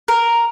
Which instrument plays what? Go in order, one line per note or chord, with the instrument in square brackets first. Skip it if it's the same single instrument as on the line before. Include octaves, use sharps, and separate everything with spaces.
[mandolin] A#4